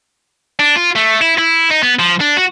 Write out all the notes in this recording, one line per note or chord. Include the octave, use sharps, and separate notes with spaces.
D4
F4
A3
E4
E4
D#4
B3
F3
D4
F#4